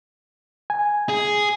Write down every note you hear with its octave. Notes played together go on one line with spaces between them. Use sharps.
G#5
G#4